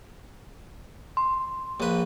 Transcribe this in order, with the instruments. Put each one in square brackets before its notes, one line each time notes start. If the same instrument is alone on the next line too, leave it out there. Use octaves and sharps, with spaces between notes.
[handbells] C6
[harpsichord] A#1 B4